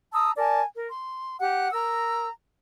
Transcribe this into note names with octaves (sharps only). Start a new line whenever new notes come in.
A5 A#5 D#6 E6
A#4 D5 G#5 A5
A#4
C6
G4 F#5 F#6
A#4 A#5 E6